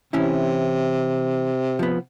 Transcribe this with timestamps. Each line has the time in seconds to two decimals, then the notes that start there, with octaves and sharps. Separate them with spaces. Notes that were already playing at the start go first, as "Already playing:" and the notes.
0.13 C3 E3 C#4 E4
1.79 F3 B3